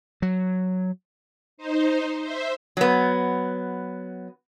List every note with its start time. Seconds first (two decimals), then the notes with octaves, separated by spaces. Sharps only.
0.22 F#3
1.58 D#4 C5
2.21 C5 E5
2.77 F#3 B3